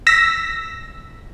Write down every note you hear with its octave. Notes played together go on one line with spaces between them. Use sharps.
E6 A#6 B6